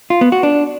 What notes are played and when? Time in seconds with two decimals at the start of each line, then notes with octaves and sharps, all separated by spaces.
0.10 F4
0.21 B3
0.32 F#4
0.43 D4